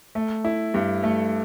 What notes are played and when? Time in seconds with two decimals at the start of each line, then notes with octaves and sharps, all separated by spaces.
0.15 A3
0.45 E4
0.74 G2
1.03 A3